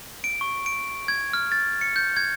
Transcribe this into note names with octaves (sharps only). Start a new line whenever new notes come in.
D7
C#6
D7
G#6
F6
A6
C#7
G6
G#6